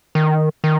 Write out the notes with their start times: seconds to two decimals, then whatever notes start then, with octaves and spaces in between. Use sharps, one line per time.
0.15 D#3
0.64 D#3